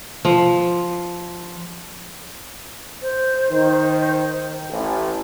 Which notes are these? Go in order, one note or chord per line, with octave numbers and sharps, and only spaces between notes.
F3
C5
D#3
A1